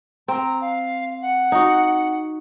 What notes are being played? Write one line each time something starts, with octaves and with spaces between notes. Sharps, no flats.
C4 A#5
F5
F#5
D#4 F#4